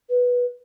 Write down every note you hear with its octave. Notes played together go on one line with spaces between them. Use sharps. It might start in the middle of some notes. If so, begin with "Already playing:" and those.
B4